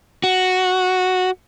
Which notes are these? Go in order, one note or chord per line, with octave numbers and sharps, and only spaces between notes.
F#4